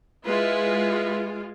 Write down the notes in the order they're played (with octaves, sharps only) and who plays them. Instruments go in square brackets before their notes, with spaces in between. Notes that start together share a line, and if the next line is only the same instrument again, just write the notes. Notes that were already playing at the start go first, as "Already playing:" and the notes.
[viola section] G#3 F4 [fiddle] E4 B4